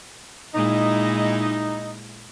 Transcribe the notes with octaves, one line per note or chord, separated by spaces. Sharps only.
A#2 G#3 D#4 E4